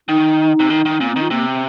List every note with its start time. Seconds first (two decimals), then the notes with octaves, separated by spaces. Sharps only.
0.08 D#3 D#4
0.60 C3
0.70 D#3
0.85 D#3
1.00 A#2 C4
1.11 D#3 C4
1.21 F4
1.31 C3 A#3
1.46 C4